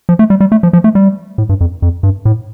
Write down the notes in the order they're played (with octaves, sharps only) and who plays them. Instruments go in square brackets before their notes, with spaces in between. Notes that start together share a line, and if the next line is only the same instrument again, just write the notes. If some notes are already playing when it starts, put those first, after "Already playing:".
[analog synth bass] F3
A3
G3
G3
A3
F3
F3
A3
G3
A2
G2
F2
F2
G2
A2